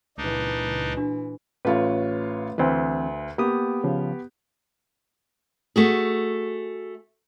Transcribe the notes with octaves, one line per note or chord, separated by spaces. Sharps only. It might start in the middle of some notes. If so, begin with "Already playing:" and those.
C#2 A#2 E3 D4 D#4
D4 F#4
A1 A3 F4 B4 C#5
D2 E3 C4 B4
A#3 B3 G4 D#6
C#3 F3
A3 F#4 G#4